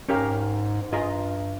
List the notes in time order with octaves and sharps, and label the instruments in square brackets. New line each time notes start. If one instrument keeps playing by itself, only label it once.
[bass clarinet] G#2 [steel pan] C#4 G4 A#4 F5
[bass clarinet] G#2
[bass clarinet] G2 [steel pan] F4 G#4 D#5 A#5